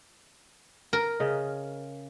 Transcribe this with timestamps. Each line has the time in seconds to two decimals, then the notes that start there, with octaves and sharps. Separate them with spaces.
0.93 A#4
1.20 C#3 D#5